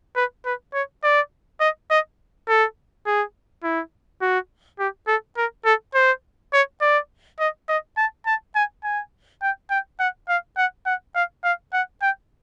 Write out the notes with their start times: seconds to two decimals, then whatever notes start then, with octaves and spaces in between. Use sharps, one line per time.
0.16 B4
0.45 B4
0.74 C#5
1.03 D5
1.61 D#5
1.91 D#5
2.48 A4
3.06 G#4
3.64 E4
4.21 F#4
4.79 G4
5.08 A4
5.37 A#4
5.65 A4
5.95 C5
6.53 C#5
6.81 D5
7.40 D#5
7.69 D#5
7.97 A5
8.26 A5
8.55 G#5
8.84 G#5
9.42 G5
9.70 G5
10.00 F#5
10.29 F5
10.57 F#5
10.86 F#5
11.15 F5
11.44 F5
11.73 F#5
12.02 G5